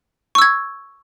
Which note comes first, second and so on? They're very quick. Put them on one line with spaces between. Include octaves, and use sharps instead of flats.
C#6 E6 G#6